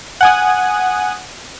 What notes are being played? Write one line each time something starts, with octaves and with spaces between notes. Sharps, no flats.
F#5 G#5 D#6